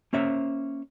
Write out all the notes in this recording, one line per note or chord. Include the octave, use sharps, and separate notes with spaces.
A#3 C#4 C5 E5